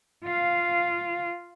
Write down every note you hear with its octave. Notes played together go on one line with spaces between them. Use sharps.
F4 F5